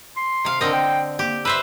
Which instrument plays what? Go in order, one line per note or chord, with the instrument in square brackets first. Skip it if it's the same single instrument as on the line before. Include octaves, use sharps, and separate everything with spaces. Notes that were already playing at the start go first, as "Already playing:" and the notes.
[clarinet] C6
[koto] C3 F5
[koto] D3 C4 D#5 [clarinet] A#4
[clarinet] G5
[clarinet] A#3 [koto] G4
[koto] B4 C5 E5 [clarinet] E6